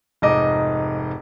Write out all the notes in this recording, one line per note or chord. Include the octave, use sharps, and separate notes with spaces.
F1 G#2 D#4 D#5 D6